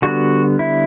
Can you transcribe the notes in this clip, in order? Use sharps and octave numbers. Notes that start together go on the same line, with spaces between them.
D3 G3 B3 F#4
E4